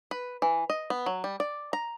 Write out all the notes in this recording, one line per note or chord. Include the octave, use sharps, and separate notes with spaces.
B4
E3
D#5
B3
F#3
G3
D5
A#5